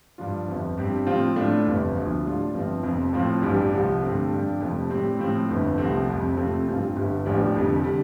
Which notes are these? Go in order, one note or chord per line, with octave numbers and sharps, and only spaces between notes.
G2 F3 D4 F4
G1 F2 F3
G2 G3 C4 G4
A2 F3 C4 F4
A2 A3 D4 F4
G1 F2 C3
D2 D3 F3
A2 G3 D4 F4
G1 G2 F3 C4
F1 F2 F3 C4
A2 F3 C4 F4
A1 G2 G3 D4 G4
C2 C3 F3
G2 D3 A3 C4 G4
G2 F3 D4 G4
F1 F2 C3 F3 A3
A2 G3 C4 G4
A2 F3 C4
G1 F2 D3
C2 C3 F3 A3 C4
F1 F2 C3 G3
F2 C3 A3 C4 F4
A1 G2 G3 C4 F4
G1 G2 D3 G3
A1 A2 F3 D4 G4
F1 F2 D3 G3
D3 G3